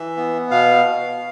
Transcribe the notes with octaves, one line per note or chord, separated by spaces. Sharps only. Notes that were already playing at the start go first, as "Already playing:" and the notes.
Already playing: E3 E5
B3
B2 F5
B2